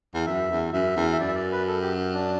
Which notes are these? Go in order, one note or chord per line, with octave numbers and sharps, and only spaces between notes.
E2
F#2 E5
E2
F#2 E5
E2
E5
F#2 D5
E5
D5
B4
A4
G4
D4